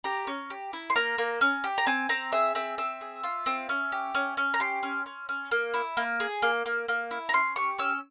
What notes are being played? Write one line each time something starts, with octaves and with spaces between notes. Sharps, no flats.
G4 A#5
C#4
G4
E4
C6
A#3 A#5
A#3
C#4
G4
A#5
C4 G#5
C4 A#5
G#4 E5
C4 E5
C4 E5
G#4
F4
C4
C#4
G4
C#4
C#4
A#5
G4 C6
C#4
C#4
C#4
A#3
E4
A#3
G#4
A#3
A#3
A#3
E4
A#5
C#4 C6
G4 C#6
C#4 E6